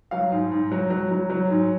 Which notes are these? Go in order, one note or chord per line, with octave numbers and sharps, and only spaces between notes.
F#3 F5
G#2
G#2
F#3
F#3
F#3
F#3
G#2